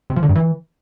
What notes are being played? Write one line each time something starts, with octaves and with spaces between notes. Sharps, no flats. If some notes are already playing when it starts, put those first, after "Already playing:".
C3
F3
D3
G2
E3